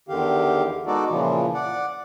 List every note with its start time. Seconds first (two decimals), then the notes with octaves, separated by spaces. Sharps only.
0.08 E2 D3 D#3 G4 F5
0.87 G#3 B3 D#4 F#4 A4 D5
1.09 A#2 C#3 E3 F3
1.54 D5 F#5